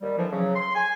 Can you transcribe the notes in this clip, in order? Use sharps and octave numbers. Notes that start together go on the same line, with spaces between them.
D#2 G3
D3 E3 F3
C#3 F#3
C6
G#5